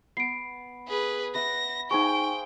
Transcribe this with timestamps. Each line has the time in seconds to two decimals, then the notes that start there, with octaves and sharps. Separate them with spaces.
0.17 B3 C7 D7
0.88 G#4 B4
1.35 B4 E5 F#5 A#6
1.91 D#4 G#4 C5 F5 G5 C#6